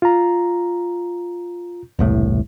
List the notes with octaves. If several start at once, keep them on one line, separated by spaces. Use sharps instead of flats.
F4 A#5
E1 C2 A2